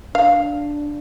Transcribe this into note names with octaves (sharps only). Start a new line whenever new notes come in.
D4 F5